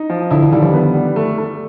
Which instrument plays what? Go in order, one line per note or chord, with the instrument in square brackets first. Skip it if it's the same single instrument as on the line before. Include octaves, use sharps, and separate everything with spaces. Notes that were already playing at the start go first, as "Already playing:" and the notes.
Already playing: [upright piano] D#4
F3
[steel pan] D3 [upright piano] E4
[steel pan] D3
[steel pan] D#3 [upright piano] G3
[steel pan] F3
[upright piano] B3
G3
A3
A3